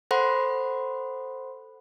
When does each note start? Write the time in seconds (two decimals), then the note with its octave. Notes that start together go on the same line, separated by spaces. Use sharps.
0.11 A4 C5 F#5 B5 C6 F#6